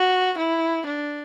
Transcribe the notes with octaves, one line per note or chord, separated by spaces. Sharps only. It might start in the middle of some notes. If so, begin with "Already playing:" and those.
Already playing: F#4
E4
D4